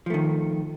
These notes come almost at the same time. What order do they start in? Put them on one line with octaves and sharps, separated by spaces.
F3 A3 D#3